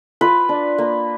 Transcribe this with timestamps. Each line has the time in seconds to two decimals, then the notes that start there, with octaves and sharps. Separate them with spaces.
0.21 F4 B4
0.49 D4
0.78 A#3